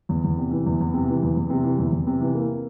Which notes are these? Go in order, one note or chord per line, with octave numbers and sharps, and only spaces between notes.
E2
E2
C3
E3
E2
E2
C3
E3
E2
E2
C3
E3
E2
E2
C3
E3
A#3